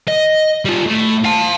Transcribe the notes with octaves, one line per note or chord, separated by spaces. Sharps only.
D#5
G3 F4
A2
F5 A5